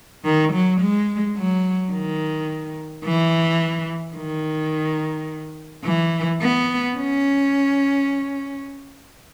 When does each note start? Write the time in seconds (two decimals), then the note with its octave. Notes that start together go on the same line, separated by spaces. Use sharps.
0.25 D#3
0.53 F#3
0.81 G#3
1.37 F#3
1.93 D#3
3.05 E3
4.17 D#3
5.85 E3
6.41 B3
6.96 C#4